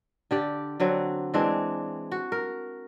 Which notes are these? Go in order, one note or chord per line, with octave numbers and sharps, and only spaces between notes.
D3 G4 D5
D3 F#3 C4
E3 G#3 C4 D4
F#4
A#4